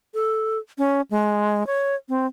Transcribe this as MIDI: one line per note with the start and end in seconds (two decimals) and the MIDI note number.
0.14 0.58 69
0.78 1.01 61
1.11 1.66 56
1.67 1.95 73
2.09 2.26 60